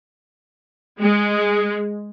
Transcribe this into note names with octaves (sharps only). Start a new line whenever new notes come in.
G#3